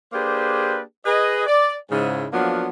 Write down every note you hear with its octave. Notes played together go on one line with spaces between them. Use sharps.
A#3 D4 G4 G#4 B4 C5
G#4 B4 D#5
D5
G#2 C#3 E4
F3 F#3 A#3 B3 D4